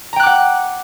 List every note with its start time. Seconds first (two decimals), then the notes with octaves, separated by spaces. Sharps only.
0.13 A#5
0.16 G5
0.20 F#6
0.23 D6
0.26 F#5